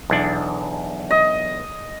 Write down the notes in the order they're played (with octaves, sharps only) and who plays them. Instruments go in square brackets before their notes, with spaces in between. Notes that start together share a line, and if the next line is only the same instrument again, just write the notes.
[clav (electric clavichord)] B1 E2 D4
[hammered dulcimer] D#5